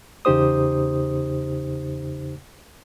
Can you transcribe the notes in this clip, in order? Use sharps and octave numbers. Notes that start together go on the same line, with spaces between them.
E2 C#3 D#4 G4 C5 D#6